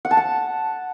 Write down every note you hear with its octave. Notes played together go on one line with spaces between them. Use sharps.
F#5
A5
F#5